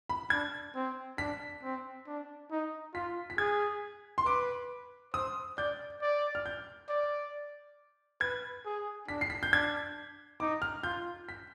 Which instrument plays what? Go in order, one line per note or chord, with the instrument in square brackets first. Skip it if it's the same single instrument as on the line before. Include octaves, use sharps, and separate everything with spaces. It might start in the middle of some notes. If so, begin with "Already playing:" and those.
[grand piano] B5
[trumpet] D4 [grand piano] G#6
[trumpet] C4
[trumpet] D4 [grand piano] B6
[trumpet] C4
D4
D#4
[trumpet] F4 [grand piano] B6
[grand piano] B6
[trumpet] G#4 [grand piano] G#6
[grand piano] C6
[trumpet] B4 [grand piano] D6
[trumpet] C5 [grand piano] D#6
[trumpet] D5 [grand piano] G6
[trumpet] D5
[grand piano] F6
G6
[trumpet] D5
[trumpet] B4 [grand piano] G#6
[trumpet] G#4
[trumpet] D4 [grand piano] B6
[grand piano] C7
B6
G6
[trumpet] D4 [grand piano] G#6
[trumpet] D#4 [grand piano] D6
[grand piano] F6
[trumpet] F4 [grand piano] G6
[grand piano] B6